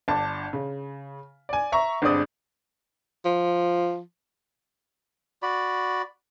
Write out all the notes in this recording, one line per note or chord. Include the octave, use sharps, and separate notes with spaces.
G1 D4 A5
C#3
D5 G#5
E5 A#5 C#6
G1 G2 G#3 C4 D5 D#6
F3
F#4 D5 B5